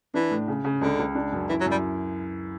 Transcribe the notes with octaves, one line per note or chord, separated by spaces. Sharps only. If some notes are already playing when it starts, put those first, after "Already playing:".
E3 D4
A2
C#3
C#3
C#2 D3
C#2
D4
F#2
E3 E4
F#3
F#2
G3